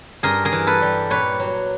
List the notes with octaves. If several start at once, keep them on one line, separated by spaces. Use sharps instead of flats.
G2 G#4 A#4
G#4 A#4
E3
A4 B4
G3
A#2 B4 C#5
F#3